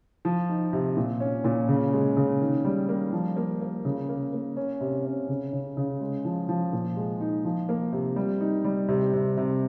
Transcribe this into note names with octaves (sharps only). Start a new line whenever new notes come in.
F3
D#4
C3
A#2
C#4
A#2
C#3
G#3
C#3
D#3
G3
A#3
F3
A#3
A#3
C#3
A#3
A#3
C#4
C3
C#4
C#3
C#3
C#3
G#3
F3
F3
A#2
G#3
D#4
F3
A#3
C3
G3
D#4
G3
C3
C3
C3